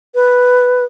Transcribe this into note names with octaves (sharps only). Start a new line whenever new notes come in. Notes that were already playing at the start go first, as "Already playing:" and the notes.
B4